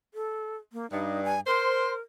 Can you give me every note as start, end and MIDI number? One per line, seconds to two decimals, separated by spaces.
0.14 0.55 69
0.73 0.89 58
0.91 1.37 43
0.91 1.23 63
1.24 1.40 80
1.47 2.00 70
1.47 1.92 72